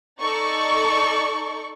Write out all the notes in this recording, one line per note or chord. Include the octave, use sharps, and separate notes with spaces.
D#4 A4 D5 C#6